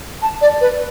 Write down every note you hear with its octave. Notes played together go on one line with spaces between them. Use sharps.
A5
D5
B4